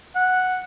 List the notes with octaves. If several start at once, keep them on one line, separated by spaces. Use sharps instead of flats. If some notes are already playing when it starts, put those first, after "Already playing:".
F#5